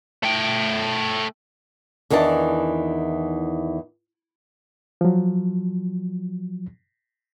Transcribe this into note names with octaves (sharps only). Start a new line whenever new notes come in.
A3 G5
E2 D#3 E3 D4 A5
F3 F#3